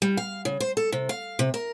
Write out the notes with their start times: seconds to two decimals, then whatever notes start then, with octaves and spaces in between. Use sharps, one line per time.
0.02 G3
0.17 F5
0.45 C#3
0.60 C5
0.77 A4
0.92 C3
1.09 F5
1.39 C3
1.54 A#4